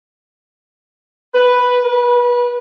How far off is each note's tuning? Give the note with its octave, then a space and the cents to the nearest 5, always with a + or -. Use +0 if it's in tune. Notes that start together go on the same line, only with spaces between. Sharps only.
B4 +0
B4 -25